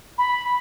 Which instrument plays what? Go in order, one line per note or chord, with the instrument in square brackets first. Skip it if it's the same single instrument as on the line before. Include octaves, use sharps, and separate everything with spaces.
[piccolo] B5